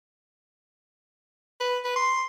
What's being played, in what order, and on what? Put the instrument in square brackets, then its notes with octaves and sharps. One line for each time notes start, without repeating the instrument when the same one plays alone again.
[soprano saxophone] B4
B4
C6